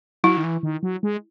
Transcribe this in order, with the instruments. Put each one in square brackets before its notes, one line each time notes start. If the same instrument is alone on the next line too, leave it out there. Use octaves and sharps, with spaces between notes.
[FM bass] F#3 [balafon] E4
[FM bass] D#3
E3
D#3
F#3
G#3